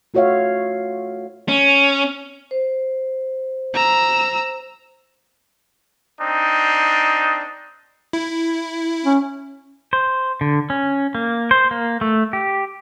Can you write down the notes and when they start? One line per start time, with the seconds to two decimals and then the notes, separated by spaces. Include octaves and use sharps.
0.14 A3 F4 F#4 C#5 E5 F5
1.48 C#4
2.51 C5
3.74 A#5 E6
6.21 C4 D4 D#4
8.13 E4
9.05 C#4
9.93 C5
10.41 D3
10.70 C#4
11.15 A#3
11.51 C5
11.71 A#3
12.01 A3
12.33 G4